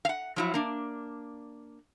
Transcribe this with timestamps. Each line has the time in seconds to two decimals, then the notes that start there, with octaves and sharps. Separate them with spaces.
0.05 F5 F#5
0.36 F3 F#3 E4
0.54 A#3 D4